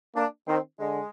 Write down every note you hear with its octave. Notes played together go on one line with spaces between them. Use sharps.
A#3 D4
D#3 C4
D3 G#3